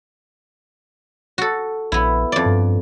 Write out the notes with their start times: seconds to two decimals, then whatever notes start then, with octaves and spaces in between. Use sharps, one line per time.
1.38 F#4 A4
1.92 A#1 B3 E4
2.32 F2 D5
2.45 G2